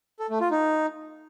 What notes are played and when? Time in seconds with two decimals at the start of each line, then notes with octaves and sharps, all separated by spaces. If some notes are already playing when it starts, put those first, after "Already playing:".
0.19 A4
0.30 A3
0.40 F4
0.51 D#4